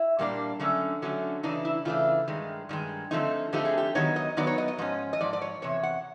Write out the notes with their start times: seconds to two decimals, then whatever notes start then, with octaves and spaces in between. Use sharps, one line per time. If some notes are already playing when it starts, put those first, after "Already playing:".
Already playing: E4
0.19 A#2 G3 A#3 D4
0.60 D3 F#3 A3 C#4
1.02 D3 F#3 A3 C#4
1.43 C#3 E3 A3 D4 D#4
1.65 E4
1.85 C#3 E3 A3 D4 F4
2.28 G2 D#3 G#3
2.69 G2 D#3 G#3
3.11 D3 F3 A3 C4 D#4
3.53 D3 F3 A3 C4 D#4 G4
3.65 G#4
3.78 G4
3.95 D#3 F#3 B3 D#4 C#5
4.16 D#5
4.37 D#3 F#3 B3 D#4 D5
4.47 C#5
4.58 D#5
4.68 D#5
4.78 G#2 F3 C#4 D#5
5.13 D#5
5.20 G#2 F3 D5
5.33 D5
5.42 C#5
5.62 E2 C3 C#5
5.83 F#5